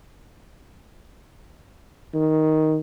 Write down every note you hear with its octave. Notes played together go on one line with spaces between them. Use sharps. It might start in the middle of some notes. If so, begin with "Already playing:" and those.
D#3